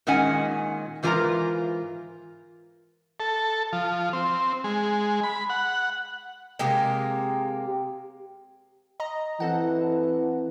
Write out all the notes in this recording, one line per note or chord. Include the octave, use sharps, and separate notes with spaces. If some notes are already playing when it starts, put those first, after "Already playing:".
A#2 D#3 G#3 C#4 F#5 G#5
G#2 E3 F4 A#4 F5 A#5
A4
F3
C4
G#3
B5
F#5
C3 G#3 A#3 G4
D#5 A#5
E3 C4 A4 F#5